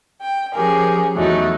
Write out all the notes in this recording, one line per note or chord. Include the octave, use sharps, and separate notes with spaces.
G5
F3 C#4 G4 G#4 A#4
E2 F#3 A3 D#4